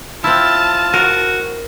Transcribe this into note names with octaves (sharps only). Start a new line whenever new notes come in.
C4 E4 F4 A5
F#4 A#4